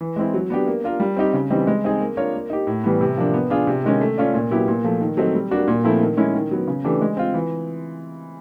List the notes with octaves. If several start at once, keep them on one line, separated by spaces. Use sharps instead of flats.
E3
G#3 C4 E4
F#3
B3 D4 G4
A#3
D4 F4 A#4
G3
C4 D#4 G4
C#3
E3 G3 C4 D#4
G#3
C4 D#4 G#4
A#3
D4 F4 A#4 C#5
A#3
D#4 G4
A2
E3 G3 B3
C3
F3 A#3 D4
B3
D4 F4 G#4
C3
D#3 G#3 C#4
A3
C#4 F4 A4 D5
A#2
F#3 B3 E4 G4
A#2
F3 A3
D#3
F#3 A3 C4 D#4
G3
A#3 D4 F#4
A#2
F3 A3 C4 E4
D#3
G#3 C#4 E4
D#3
F#3 B3
C#3
E3 A3 D4 G4
G#3
C4 F4
E3